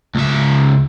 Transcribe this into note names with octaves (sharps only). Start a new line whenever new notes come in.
C#2 E5